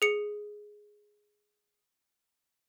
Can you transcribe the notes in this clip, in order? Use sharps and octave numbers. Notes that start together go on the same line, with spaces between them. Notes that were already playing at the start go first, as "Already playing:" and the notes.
G#4 C#7